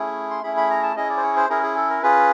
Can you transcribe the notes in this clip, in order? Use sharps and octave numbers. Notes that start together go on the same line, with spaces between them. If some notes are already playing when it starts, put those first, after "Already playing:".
Already playing: A3 C#4 E4 G#4
C6
A3 C#4 E4 G#4 B5
B5
A#5
A5
C#4 E4 G#4 D#5
D5
C5
C#5
C5
C#4 E4 G#4 A#4
G#4
A4
A#4
C#4 F4 G#4 B4